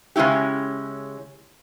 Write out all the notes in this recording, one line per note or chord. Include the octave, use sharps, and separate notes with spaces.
C#3 G#3 C#4 E4 G4